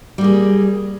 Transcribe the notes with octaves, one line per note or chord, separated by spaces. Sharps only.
G3 A#3 G#4